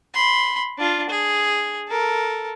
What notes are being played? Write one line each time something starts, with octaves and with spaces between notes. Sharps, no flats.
B5 C6
D4 F4
G#4
A4 A#4